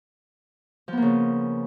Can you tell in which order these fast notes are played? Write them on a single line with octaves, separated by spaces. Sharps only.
F3 B3 A#3 C#3